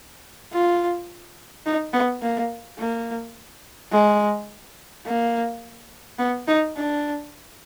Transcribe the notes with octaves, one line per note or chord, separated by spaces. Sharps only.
F4
D#4
B3
A#3
A#3
G#3
A#3
B3
D#4
D4